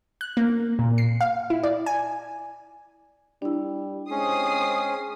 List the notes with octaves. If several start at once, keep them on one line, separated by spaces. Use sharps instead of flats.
F#6
A#3
A#2
C7
F5
E4
D5
G#5
G3 D4 E4
G#3 C4 C#4 D#6 C7